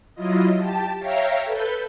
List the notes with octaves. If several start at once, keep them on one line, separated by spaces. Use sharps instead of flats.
F#3 E4 F4 D#5
G4 A5
C#5 E5 F5 G5 A#5
A4 B4 G6